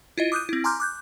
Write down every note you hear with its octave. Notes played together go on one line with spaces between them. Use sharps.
E4 F4 D#5
D6 D#6 F#6 G6 D#7
C4 E4
G#5 A#5 C6 D6 F6 G6
D6 F#6 G6